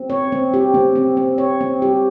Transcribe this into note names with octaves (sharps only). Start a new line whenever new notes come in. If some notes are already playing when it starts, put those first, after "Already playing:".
Already playing: C4
C#5
C4
G4
C4
C4
C4
C#5
C4
G4